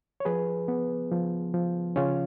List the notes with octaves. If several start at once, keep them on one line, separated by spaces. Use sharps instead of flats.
C#5
F3 G#4 B4
B3
F3
F3
C#3 C#4 F4